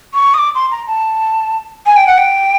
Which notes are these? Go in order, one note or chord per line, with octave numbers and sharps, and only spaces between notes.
C#6
D#6
D6
C6
A#5
A5
G#5
G5
F#5
G5